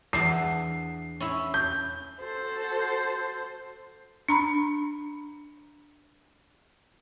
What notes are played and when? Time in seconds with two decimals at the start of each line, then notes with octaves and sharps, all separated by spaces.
0.13 E2 D4 E5 C7
1.20 C#4 E4 E5
1.54 G6
2.19 F#4 A4 C5
4.29 D4 A#5 B5